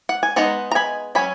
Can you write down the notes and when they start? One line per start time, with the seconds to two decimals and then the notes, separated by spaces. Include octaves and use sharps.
0.09 F#5
0.23 G#5
0.36 G#3 B3 D#4 F#5 A#5
0.71 A#5
0.75 G#5 B5
1.15 F#3 C#4 G#5 B5